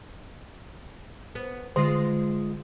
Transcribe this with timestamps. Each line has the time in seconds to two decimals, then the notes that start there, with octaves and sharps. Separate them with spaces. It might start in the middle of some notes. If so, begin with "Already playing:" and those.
1.35 B3
1.76 D3 G#3 F4